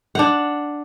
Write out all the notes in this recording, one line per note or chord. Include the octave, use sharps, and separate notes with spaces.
D4 F#5